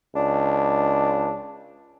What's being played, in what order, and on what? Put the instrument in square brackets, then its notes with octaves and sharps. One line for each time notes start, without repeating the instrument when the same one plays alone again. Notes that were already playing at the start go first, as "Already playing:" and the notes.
[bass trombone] C#2 [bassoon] D4